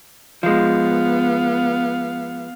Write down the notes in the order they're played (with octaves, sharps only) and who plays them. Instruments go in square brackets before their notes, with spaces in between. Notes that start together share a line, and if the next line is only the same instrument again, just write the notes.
[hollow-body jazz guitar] F3 G#3 [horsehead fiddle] B3 F5